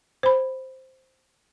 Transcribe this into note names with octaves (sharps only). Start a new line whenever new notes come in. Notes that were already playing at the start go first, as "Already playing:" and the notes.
C5 B5